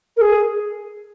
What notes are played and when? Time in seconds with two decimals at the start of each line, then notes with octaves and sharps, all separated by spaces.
0.17 A#4
0.21 G#4